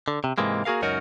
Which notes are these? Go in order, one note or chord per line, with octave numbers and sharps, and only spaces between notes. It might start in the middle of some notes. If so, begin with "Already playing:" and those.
D3
C3
G#2 C3 E3 G#3 A#3
A#3 F#4 G#4 A#4 F5
C#2 F#2 C#4 D#4 F#4 A#4